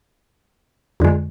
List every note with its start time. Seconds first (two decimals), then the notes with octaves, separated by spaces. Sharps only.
1.00 F2 D3 G#3